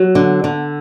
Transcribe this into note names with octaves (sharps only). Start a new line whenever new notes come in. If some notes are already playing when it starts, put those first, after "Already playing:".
Already playing: F#3
D3
D3